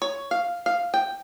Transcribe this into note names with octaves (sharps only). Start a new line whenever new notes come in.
C#5
F5
F5
G5